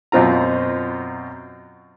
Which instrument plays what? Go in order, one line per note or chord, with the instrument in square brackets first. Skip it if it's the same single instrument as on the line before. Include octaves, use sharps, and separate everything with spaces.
[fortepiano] F#2 B2 C4 F4 A#5